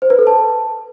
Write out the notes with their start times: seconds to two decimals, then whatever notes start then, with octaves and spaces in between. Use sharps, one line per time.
0.02 C5
0.10 B4
0.19 A4
0.27 A5